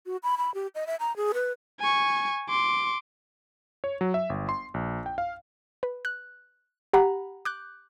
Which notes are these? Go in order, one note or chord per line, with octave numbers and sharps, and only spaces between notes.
F#4
B5
B5
G4
D#5
E5
A#5
G#4
B4
G#5 C#6
C6 D6
C#5
F#3
E5
G1
C6
A#1
G5
F5
B4
F#6
G4 F#5 A#5 B5
D6 F#6 G6